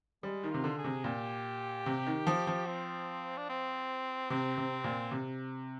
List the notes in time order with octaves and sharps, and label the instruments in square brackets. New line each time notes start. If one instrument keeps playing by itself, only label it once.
[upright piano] G3 [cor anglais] G#3
[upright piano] D#3
[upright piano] C3 [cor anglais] F4
[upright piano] D3
[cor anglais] G#4
[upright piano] C3
[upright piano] A#2 [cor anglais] G4
[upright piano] C3
D#3
F3
F3
[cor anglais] C4
D4
C4
[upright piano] C3 [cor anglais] C4
[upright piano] C3
A#2
C3